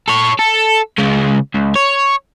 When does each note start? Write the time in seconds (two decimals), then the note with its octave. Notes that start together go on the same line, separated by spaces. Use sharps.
0.08 A4 C#5
0.39 A4
0.98 C#3 G#3
1.55 C#2
1.76 C#5